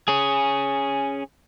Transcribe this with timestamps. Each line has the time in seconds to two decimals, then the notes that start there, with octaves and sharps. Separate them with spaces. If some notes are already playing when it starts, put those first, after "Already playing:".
0.08 C#4 G#4